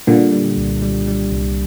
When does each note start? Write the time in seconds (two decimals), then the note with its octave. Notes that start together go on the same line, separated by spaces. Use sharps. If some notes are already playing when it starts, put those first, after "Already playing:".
0.07 A#2 D3 G3
0.32 G3
0.57 C2
0.83 G3
1.08 G3
1.32 C2